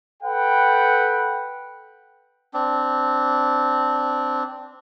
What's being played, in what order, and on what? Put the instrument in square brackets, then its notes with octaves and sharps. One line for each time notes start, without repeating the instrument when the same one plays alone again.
[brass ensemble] A4 B4 F#5 G5
[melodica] C4 D4